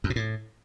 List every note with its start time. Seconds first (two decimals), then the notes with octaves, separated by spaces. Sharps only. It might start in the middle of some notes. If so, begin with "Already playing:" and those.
0.04 F#2
0.10 B2
0.16 A2